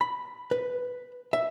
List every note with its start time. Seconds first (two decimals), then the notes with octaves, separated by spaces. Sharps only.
0.01 B5
0.51 B4
1.33 E5